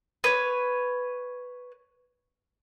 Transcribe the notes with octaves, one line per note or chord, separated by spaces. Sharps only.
B4 C#5